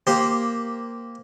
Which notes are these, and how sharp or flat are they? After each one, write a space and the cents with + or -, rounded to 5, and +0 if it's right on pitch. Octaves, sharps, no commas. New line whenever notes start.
A#3 +0 G4 +0 C5 +0